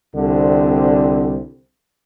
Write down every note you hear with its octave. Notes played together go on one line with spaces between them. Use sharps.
C2 D3 C4